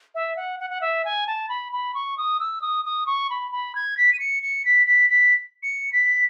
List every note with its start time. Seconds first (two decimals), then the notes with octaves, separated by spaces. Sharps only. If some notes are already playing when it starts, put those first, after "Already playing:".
0.15 E5
0.36 F#5
0.60 F#5
0.70 F#5
0.81 E5
1.05 G#5
1.27 A5
1.49 B5
1.73 B5
1.94 C#6
2.18 D#6
2.40 E6
2.62 D#6
2.85 D#6
3.06 C#6
3.30 B5
3.52 B5
3.75 G#6
3.97 B6
4.13 D#7
4.19 C#7
4.43 C#7
4.65 B6
4.87 B6
5.10 B6
5.63 C#7
5.93 B6